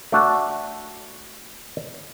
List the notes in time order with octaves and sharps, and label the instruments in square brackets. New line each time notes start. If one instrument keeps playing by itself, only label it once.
[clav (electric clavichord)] A3 D4 F#4 A5